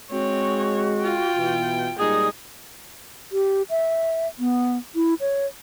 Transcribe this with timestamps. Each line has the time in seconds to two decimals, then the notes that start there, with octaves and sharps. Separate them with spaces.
0.12 G#3 C4 F#4 C#5
1.04 F4 G5
1.36 B2 E3
1.99 A#2 G3 G#3 D#4 G#4 D#6
3.32 G4
3.70 E5
4.39 B3
4.95 E4
5.21 C#5